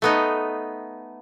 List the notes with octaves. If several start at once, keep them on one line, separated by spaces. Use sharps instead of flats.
A3 B3 D#4